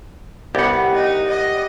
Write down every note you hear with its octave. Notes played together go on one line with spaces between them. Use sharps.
C2 B3 G4 F#5
D#4
D#5